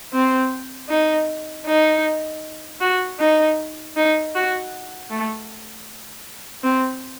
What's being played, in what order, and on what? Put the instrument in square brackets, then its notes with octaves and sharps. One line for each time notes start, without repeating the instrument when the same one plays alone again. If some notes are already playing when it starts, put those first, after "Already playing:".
[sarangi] C4
D#4
D#4
F#4
D#4
D#4
F#4
A3
C4